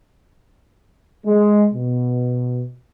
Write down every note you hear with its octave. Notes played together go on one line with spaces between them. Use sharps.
G#3
B2